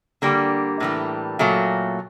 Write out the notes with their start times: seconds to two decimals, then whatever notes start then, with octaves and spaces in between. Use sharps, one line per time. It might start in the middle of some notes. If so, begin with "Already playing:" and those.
0.22 D3 G3 A#3
0.80 A2 E3 G3
1.39 A#2 F#3 A3